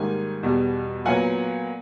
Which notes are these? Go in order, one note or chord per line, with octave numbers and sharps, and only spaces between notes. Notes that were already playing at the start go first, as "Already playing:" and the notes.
Already playing: G#2 D#3 G3 A#3 G#5
E2 B2 G3
A#2 F#3 B3 F#5 G#5